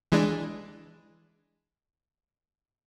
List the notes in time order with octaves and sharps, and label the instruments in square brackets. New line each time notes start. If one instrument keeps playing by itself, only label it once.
[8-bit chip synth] E3 G#3 D4